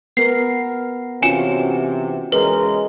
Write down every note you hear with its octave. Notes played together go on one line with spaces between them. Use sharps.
B3 A#4 C7
C3 E3 C#4 F4 F#4 G#5 C#7 E7
C#3 E3 G#3 A#4 B4